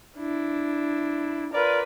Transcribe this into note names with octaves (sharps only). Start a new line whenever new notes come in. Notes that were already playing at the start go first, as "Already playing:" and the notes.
D4 E4
F4 A#4 B4 D5